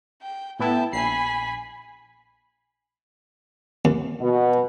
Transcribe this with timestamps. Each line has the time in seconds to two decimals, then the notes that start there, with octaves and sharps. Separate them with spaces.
0.22 G5
0.59 A2 B3 E4 G5 A5
0.93 A#1 G#5 B5 C7
3.85 D#2
4.21 B2